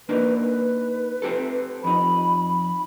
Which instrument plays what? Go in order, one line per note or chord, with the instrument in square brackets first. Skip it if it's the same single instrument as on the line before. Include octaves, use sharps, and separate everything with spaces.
[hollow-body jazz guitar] A#3 D4 D#4 [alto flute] B4
[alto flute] B4
[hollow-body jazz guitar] C4 G4 A4
[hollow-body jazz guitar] F2 D#4 [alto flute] B5